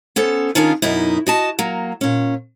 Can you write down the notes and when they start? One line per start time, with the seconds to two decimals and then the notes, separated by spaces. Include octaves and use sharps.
0.16 B3 C#4 A4 C5
0.55 D#3 C#4 D4 F4 G#4 A#4
0.82 F#2 B2 D#4 E4
1.27 F#4 D#5 A5
1.59 F#3 A#3
2.01 A#2 C#4